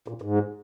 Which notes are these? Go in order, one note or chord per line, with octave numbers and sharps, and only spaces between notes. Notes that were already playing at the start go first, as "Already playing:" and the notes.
A#2
G#2